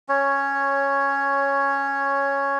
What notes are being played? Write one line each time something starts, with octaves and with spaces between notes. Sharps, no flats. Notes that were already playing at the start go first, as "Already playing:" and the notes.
C#4 C#5